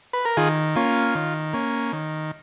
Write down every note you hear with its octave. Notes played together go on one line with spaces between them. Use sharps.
B4
A#4
D#3 F4 G#4
A#3 C#4 F4
D#3
A#3 C#4
D#3